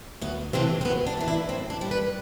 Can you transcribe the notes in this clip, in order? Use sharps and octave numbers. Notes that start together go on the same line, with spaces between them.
D2 B3
C3 E3 A3 C4
C4
D2 B3
D4
C3 E3 D4
E4
A2 C4
D4
G3
B4